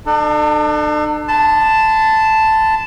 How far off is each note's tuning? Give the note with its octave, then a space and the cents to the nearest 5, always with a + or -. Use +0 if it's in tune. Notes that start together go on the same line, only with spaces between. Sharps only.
D4 +40 A4 +0
A5 +0 C6 -45